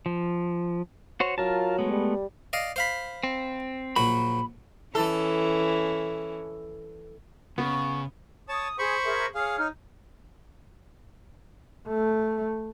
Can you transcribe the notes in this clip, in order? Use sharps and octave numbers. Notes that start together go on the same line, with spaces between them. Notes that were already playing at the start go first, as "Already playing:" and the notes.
F3
F#4 C5 C#5
F#3 F4 A#4 A5
G#3 A3 B3
G3
D5 D#5 F5
C5 F5 B5
C4
A#1 F#3 F#4 B5
E3 C#4 A4
C#3 B3 C#6
C#5 A5 D#6
G#4 C5 B5 C#6
G#4 A#4 E5
G#4 C#5 F5 F6
D#4
A3